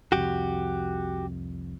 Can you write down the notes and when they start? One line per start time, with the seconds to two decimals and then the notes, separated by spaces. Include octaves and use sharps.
0.12 C2 F2 F#4 G4